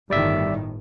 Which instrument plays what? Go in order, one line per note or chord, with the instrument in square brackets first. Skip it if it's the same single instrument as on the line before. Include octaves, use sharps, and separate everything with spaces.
[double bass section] G1 A2 D#3 [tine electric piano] G3 D5 E5